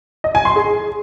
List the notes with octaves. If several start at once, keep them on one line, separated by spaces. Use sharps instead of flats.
D#5
G#5
C6
G#4